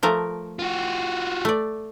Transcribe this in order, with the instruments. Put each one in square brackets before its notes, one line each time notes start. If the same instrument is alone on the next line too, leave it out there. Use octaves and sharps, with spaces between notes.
[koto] F3 A3 A#4
[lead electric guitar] F4 F#4
[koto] A3 D5